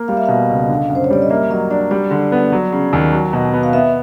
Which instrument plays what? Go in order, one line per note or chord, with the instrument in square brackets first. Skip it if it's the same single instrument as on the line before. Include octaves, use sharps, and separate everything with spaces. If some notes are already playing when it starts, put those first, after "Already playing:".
Already playing: [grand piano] A#3
[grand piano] G3 [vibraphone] F5
[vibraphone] E5
[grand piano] B2 [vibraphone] F5
[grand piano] C#2
D3
F#2
[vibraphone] C5
C#5
[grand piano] G3 [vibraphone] D5
[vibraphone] D#5
[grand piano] A#3 [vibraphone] E5
[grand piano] F#3 [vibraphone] D#5
[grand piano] D4 [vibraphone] D5
[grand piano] G3 [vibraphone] D5
[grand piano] D3
B3
F#3
C#3
D#2
F#3
B2
B3
[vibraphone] F5
[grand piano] B3 [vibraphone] E5